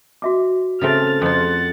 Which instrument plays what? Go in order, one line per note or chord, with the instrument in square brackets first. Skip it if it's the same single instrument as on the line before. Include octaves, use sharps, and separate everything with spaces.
[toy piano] F#4 E5 D6
[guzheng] C#3 A3 C4 [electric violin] F6 A6
[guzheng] F2 C5 [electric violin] F#5 A6